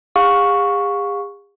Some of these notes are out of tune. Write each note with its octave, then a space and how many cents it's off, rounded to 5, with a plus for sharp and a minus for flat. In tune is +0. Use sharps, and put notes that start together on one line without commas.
G#4 -45 F5 +35 C#6 +0